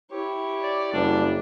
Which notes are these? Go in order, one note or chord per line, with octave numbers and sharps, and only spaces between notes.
E4 G4 C#5
D5
F#1 G3 D4